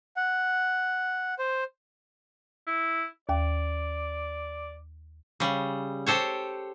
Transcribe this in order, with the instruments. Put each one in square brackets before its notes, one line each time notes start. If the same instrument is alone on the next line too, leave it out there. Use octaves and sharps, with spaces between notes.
[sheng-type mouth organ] F#5
C5
[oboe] E4
[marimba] D#2 G5 [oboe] D5
[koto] C#3 G3
G4 A4 C5 C#5